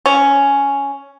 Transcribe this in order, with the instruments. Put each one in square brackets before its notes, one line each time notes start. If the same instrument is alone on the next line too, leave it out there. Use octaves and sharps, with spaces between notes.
[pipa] C#4